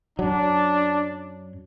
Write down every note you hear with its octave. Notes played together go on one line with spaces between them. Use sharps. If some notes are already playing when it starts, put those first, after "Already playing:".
F#2 F#3 D4